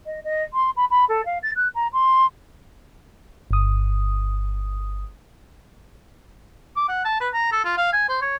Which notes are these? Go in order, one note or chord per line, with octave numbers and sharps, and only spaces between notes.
D#5
D#5
C6
B5
B5
A4
F5
A6
F#6
A#5
C6
G1 D#6
D6
F#5
A5
B4
A#5
A4
F4
F5
G#5
C5
C#5